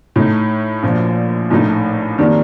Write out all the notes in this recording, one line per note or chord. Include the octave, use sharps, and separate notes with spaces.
A2 A3 D#4
A#1 A#2 F3
A#1 A2 A3 D#4
F2 D#3 G3 A#3 D4